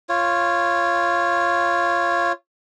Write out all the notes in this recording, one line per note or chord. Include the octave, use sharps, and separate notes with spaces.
F4 C#5